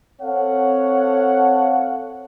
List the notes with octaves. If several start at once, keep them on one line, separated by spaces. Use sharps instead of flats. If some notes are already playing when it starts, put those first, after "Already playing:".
C4 A4 C#5 F5 F#5